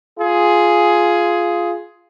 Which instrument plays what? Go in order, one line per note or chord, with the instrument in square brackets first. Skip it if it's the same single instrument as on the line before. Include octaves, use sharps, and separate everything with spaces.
[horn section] F4 G#4